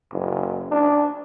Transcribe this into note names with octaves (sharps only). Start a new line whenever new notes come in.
F#1
D4